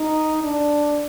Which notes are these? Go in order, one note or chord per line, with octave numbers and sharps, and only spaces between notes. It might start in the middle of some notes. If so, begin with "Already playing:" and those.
Already playing: D#4
D4